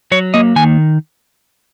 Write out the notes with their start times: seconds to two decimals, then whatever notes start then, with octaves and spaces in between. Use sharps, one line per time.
0.12 F#3 C#5
0.34 A#3 D#5
0.56 D#3 G#5